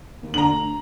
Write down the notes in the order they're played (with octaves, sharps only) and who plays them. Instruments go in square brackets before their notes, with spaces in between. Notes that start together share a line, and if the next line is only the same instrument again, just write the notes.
[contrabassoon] D#2
[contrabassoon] D3 [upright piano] A#5 F#7
[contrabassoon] D2